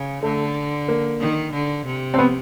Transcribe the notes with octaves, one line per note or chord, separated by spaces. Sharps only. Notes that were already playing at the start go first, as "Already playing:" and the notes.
Already playing: C#3
D3 A3
A#3
D#3
D3
C3
C4
B3